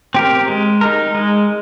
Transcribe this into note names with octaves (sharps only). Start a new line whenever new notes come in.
C4 G4 A#4
G#3
D#4 A#4
G#3